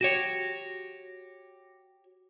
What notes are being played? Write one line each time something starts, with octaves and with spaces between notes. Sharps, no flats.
F#4 G4 C#5